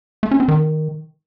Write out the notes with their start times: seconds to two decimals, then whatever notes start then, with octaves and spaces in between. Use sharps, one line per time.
0.23 A3
0.31 C#4
0.40 C4
0.48 D#3